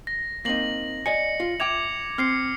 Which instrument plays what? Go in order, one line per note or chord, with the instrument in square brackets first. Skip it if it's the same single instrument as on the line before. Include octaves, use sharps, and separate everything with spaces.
[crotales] A#6
[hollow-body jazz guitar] A#3 C4 D#4 [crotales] A#6 F#7
[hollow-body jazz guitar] D5 D#5 G#5 [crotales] C#7
[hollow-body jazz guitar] F4
[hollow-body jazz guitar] E5 G5 [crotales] D6 G#6 F7
[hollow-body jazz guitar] C4 [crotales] F6 C7 C#7